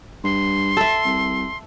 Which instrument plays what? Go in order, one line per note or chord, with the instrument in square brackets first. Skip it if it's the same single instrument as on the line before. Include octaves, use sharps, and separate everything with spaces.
[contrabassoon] G2 [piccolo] C6
[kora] A4 E5
[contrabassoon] C2